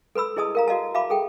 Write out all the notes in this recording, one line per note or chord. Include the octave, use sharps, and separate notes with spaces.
A4 B4 B5 E6
E4 G#4 D#5 A5 D#6
A#4 F5 A#5
F#4 D#5 F5 A5
E5 F5 A5 B5 D6
G#4 A4 G5